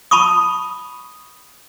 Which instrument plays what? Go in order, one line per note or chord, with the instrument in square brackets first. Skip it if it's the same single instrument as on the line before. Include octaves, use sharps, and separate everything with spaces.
[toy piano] A5 B5 C#6 D#6